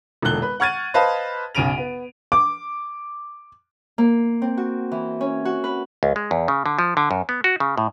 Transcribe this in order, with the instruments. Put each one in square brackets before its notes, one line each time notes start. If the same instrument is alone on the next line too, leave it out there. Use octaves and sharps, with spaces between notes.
[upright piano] E1 A#2 D3 A4 F#6 G7
B4
F#5 C#6 F6 G#6 A6 D#7
B4 C5 D#5 F5 A5 C6
B1 C#3 G#5 D7 D#7 F7
B3
D6
[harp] A#3
C4
F#4
E3
C#4
F#4
B4
[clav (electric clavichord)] C#2
G#3
E2
C#3
D3
F3
D3
F#2
B3
F#4
C#3
A2